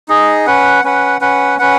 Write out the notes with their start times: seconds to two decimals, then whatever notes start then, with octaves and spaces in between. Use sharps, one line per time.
0.08 D#4 G#4 D#5
0.47 C#4 B4 F#5
0.84 C#4 B4 F#5
1.21 C#4 B4 F#5
1.59 C#4 B4 F#5